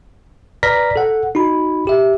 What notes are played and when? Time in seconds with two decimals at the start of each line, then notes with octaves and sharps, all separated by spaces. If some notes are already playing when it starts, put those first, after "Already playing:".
0.63 B4 D5 A#5 F6 A#6 B6
0.96 A4 F#5
1.35 D#4 F#4 B5
1.87 G4 E5